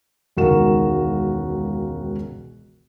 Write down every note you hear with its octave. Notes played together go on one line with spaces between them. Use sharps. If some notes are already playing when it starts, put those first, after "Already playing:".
E1 C#2 D#3 F#4 A#4 E7